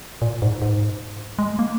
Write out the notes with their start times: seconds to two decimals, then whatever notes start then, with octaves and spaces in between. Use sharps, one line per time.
0.22 A#2
0.42 G#2
0.62 G#2
1.39 G#3
1.59 A#3